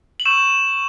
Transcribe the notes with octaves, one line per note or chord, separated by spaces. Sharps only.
F#7
C#6 E6 G6 E7